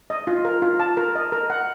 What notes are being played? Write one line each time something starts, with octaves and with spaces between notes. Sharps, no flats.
D#5
F4
A#4
F4
A5
A#4
D#5
A#4
F#5